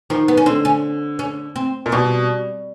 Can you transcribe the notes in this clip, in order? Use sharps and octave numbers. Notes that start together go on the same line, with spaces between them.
D#3 F3
B3
C#4
D3 C4
C#4
C#4
C4
A#2
B2 G3